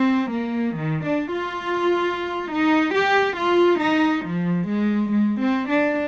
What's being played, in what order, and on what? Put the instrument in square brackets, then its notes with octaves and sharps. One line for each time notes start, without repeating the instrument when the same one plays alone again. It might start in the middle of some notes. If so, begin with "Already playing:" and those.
Already playing: [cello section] C4
A#3
D#3
D4
F4
D#4
G4
F4
D#4
F3
G#3
G#3
C4
D4